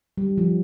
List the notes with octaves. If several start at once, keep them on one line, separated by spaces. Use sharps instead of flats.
G3
F3